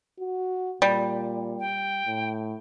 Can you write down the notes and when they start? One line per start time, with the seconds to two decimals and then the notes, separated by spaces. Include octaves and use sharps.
0.20 F#4
0.82 A#2 G3
1.59 G5
2.07 A2